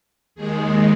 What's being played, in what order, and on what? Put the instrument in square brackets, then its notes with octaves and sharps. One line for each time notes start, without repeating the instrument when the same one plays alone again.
[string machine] D#2 D#3 G#3 G#4